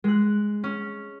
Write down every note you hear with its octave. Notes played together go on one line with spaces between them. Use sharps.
G#3 F#6
C#4